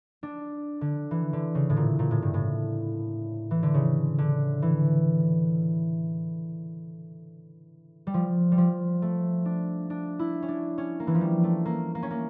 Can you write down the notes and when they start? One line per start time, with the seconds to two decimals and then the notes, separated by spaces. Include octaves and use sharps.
0.23 D4
0.81 D3
1.11 E3
1.33 D3
1.55 C#3
1.70 A2
1.77 A#2
1.99 A#2
2.11 A2
2.22 G2
2.34 A2
3.51 E3
3.63 D3
3.74 C#3
4.18 D3
4.62 E3
8.07 G3
8.14 F3
8.52 G3
8.58 F3
9.02 A3
9.45 D4
9.90 D4
10.19 E4
10.42 C#4
10.48 D4
10.78 C#4
11.00 A#3
11.07 E3
11.15 F3
11.21 G3
11.44 A3
11.65 A#3
11.95 A#3
12.03 C#4
12.11 A#3